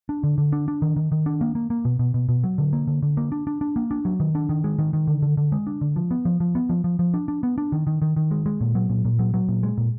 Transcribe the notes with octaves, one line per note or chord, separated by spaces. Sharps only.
D4
D3
D3
D4
D4
D#3
D#3
D#3
D4
A#3
A#3
A#3
B2
B2
B2
B2
F#3
D3
A#3
D3
D3
A#3
D4
D4
D4
A#3
D4
F#3
D#3
D4
D#3
G#3
D#3
D#3
D3
D3
D3
G#3
D4
D3
F3
B3
F3
F3
B3
F3
F3
F3
D4
D4
B3
D4
D#3
D#3
D#3
D#3
G#3
G#3
A#2
F#3
A#2
A#2
F#3
F#3
A#2
G#3
A#2